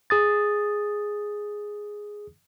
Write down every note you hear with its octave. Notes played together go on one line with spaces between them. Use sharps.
G#4 D#6 A6